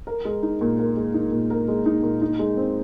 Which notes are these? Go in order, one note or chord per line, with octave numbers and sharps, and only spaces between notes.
A#4
G#3
D#4
A#2
A#4
G#3
D#4
A#2
A#4
G#3
D#4
A#2
D#4
G#3
C4